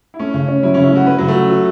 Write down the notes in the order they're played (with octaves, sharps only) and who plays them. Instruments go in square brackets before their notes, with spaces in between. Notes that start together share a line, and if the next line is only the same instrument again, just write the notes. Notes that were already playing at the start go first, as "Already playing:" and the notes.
[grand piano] E4
[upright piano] A3 [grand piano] C#4
[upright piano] C#3
C#4
[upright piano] F#3 [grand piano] E4
[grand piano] C#4
[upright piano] C#3
[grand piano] E4
[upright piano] A3 [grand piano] F#4
[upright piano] A3 [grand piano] B4
[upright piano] C#3 [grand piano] F#3
[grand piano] A3
[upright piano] F#4
F#4